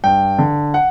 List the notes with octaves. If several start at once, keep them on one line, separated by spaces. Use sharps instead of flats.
G2 G5
D3
F#5